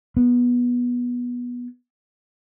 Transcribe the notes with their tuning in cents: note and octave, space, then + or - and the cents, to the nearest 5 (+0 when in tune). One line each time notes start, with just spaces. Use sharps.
B3 -15